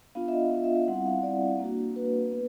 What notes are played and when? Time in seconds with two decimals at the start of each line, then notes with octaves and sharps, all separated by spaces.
0.15 B3 D4 F4 F5
0.28 E5
0.33 D#5
0.51 B3 D4 F4 E5
0.64 E5
0.75 E5
0.88 G3 C4 E4 F#5
1.06 F5
1.23 G3 C4 E4 D5
1.59 A#3 D4 F#4
1.96 A#3 D4 F#4 B4
2.32 B3